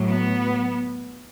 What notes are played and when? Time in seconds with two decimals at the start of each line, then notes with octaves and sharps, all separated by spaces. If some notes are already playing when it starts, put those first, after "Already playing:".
Already playing: A2 F#3
0.10 B3